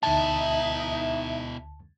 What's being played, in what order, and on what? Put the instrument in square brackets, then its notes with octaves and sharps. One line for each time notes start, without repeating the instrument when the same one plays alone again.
[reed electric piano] D2 A5 [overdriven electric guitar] B2 E4 [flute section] D#4 E5